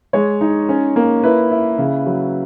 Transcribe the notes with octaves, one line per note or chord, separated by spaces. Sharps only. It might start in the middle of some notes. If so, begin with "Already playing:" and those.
G#3 C#5
D#4
C#4
A#3
E4 B4
E4
C#3
F#3